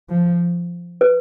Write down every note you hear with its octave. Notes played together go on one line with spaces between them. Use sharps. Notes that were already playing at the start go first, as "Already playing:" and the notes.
F3
B4